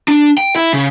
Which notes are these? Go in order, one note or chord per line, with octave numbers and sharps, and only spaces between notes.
D4
G5
E4
C#3